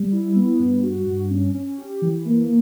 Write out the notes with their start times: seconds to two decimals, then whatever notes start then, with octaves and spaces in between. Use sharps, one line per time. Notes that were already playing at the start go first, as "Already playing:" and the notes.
Already playing: G3
0.12 E4
0.35 B3
0.59 G2
0.83 F#4
1.07 G2
1.31 C#4
1.54 C#4
1.78 G4
2.02 E3
2.25 A#3